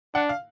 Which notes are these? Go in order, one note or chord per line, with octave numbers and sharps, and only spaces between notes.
D4 F#5
F5